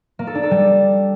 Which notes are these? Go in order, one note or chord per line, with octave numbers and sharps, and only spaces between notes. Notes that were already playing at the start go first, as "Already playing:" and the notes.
A#3
A4
D4
A4
G3